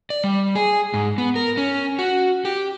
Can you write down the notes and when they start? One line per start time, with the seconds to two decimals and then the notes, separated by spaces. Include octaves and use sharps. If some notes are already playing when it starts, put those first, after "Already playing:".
0.10 D5
0.24 G3
0.55 G#4
0.94 G#2
1.18 B3
1.36 A#4
1.57 C#4
1.99 F#4
2.45 G4